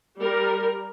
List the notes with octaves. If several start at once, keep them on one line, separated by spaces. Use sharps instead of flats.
G3 A#4